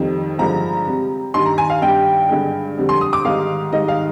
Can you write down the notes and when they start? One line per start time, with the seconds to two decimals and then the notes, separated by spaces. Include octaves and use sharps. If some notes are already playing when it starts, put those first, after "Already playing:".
Already playing: F2 D#3 G3
0.38 G2 D3 F3 G#3 A#5
0.86 C3 G3
1.34 G2 D#3 G3 C6
1.46 A#5
1.58 G#5
1.70 F5
1.82 G2 D#3 G3 G5
2.29 G2 D3 G#3
2.78 F2 D3 G3
2.89 C6
3.01 D#6
3.13 D6
3.24 G#2 D#3 G3 F5
3.72 G#2 D#3 G3 D#5
3.88 F5